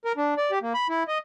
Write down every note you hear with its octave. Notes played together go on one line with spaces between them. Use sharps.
A#4
D4
D5
G4
A#3
B5
E4
D#5